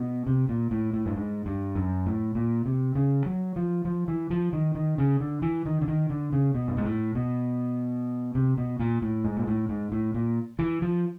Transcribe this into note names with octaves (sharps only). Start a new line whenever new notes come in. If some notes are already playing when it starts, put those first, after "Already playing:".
Already playing: B2
C3
A#2
A2
A2
G2
G#2
G2
F#2
A2
A#2
C3
C#3
F#3
F3
F3
E3
F3
D#3
D#3
C#3
D3
E3
D#3
D3
D#3
D3
C#3
B2
G2
G#2
A2
B2
C3
B2
A#2
A2
G#2
A#2
A2
G#2
A2
A#2
E3
F3